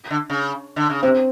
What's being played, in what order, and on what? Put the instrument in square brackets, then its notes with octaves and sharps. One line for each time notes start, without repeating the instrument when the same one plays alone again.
[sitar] D3
C#3
D3
C#3
[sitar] C3 [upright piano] C4